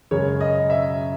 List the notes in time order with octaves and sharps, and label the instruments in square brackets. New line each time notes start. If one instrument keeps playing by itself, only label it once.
[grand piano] F#2 C#3 G#3 [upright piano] C#5
[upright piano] D#5
E5